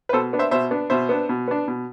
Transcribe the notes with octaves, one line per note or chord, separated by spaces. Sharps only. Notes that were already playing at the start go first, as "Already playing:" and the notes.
B4
B2 A4 C5
B3 D4
C5 E5
B2 C5 E5
B3 D4
B2 C5 E5
B3 D4
B2
B3 D4
B2